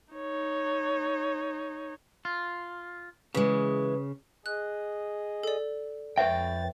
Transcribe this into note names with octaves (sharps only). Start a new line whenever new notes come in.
D#4 C#5
F4
C#3 E3 G#3
G#4 D#5 F#6
A4 D5
F2 B4 C#5 E5 G5 A6